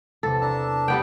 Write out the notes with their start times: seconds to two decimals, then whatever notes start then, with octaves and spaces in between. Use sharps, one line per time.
0.23 B1 E2 C3 A4
0.42 D4 A5 A#5 E6
0.88 G3 B3 G5